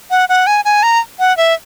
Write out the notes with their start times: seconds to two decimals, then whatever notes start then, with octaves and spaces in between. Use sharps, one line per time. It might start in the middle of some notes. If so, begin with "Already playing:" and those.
0.11 F#5
0.29 F#5
0.47 G#5
0.65 G#5
0.83 A#5
1.19 F#5
1.37 E5